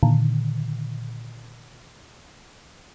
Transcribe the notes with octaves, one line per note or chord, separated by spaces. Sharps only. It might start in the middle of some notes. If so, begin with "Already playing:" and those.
A#2 D3 D#3